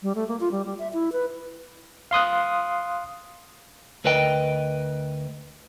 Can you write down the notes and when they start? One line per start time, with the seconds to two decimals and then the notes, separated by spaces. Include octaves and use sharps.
0.03 G3
0.15 A3
0.28 A#3
0.40 F4
0.52 G3
0.66 G3
0.79 E5
0.93 E4
1.12 B4
2.11 F5 C6 D#6 F#6
4.04 D2 A#4 B4 D#5 G5